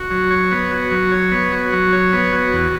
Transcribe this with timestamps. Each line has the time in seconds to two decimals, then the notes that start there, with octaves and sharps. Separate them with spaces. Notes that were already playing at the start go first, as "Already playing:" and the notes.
Already playing: F#4
0.11 F#3
0.31 C#5
0.52 B3
0.71 F#4
0.91 F#3
1.12 C#5
1.31 B3
1.52 F#4
1.73 F#3
1.93 C#5
2.13 B3
2.32 F#4
2.53 E2